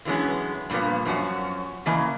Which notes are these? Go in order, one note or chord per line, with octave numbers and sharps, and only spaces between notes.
D3 E3 F#3 G#3 B3 C#4
G2 A#2 F3 A#3 B3
F#2 F3 C#4 F#4
C#3 E3 A#3 D#5 G#5